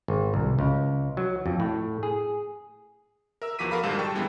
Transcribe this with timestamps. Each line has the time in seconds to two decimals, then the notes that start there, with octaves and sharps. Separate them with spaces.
0.08 G#1
0.34 C2
0.59 C#2
1.17 F#3
1.46 F2
1.60 A2
2.03 G#4
3.42 A#4 E5 E6
3.59 E2 F3 F#4 D6 B6 D#7
3.71 F#4 A4 A#4 F5 B5
3.83 A#1 G#2 D#3 G3 A4 E7
3.99 G3 A4 G5 A5 C#6
4.14 F#2 D3 E3 G3 G#3 B3